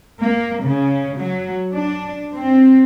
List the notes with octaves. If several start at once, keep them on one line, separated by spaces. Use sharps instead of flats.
A#3
C#3
F#3
D4
C4